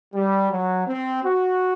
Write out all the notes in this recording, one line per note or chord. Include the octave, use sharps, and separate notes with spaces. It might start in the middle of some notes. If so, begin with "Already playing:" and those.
G3
F#3
C4
F#4